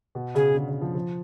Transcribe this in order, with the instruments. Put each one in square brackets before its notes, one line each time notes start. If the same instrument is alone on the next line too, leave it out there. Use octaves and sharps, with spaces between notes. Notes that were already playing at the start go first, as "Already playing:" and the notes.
[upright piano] B2
[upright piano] C#3 [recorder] G#4
[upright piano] D3
C#3
F3
F3